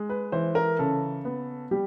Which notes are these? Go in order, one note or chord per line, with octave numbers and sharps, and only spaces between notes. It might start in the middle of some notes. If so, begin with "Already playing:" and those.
Already playing: G#3
B4
E3 C5
A#4
C#3 A4
B3
G3 G4